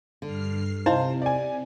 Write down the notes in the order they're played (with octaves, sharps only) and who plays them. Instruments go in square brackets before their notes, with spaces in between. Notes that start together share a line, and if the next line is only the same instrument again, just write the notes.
[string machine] G2 F6 C7 [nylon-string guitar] D3
[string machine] C3 [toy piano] D#4 E4 D#5 [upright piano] C5 [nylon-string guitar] F5
[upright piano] D5 G#5